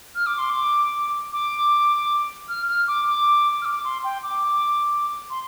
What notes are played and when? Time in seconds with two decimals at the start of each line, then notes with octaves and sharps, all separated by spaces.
0.15 F6
0.27 D6
0.38 C6
0.50 D6
1.32 D6
2.49 F6
2.68 F6
2.87 D6
3.07 D6
3.62 F6
3.65 D6
3.84 C6
4.04 G5
4.23 D6
5.30 C6